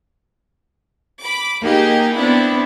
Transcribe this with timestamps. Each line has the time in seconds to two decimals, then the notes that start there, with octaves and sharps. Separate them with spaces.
1.21 B5 D6
1.64 A#3 D#4 G4 G#4
2.16 B3 C4 D4 E4